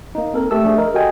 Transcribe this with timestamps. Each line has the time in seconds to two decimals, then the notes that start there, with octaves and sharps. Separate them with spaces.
0.15 A#3 D#4
0.33 C4 A4 A#4
0.51 A3 G4 A5 E6
0.64 F3 A3 D4 G#4
0.76 A#4 D#5
0.94 F#4 G4 A4 D#5 G5 G#5